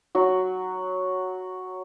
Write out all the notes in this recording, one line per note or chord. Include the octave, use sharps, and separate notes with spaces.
F#3 F#4